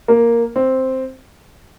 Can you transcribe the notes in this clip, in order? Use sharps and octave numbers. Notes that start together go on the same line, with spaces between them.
A#3
C4